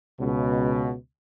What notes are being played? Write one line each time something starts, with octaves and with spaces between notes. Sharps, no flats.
C#2 B2